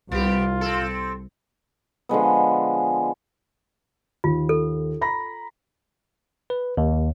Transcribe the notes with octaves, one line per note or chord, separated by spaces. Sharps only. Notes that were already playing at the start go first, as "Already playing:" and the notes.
C2 B3 F4 G4
C4 A4
D3 F3 G#3 B3
D#2 F4
A4
A#5 B5 A#6
B4
D#2